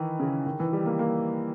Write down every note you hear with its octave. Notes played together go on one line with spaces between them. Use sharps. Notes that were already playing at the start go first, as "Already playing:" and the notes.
Already playing: D#3 E3
C#3
D#3
E3
G3
A#3
A#3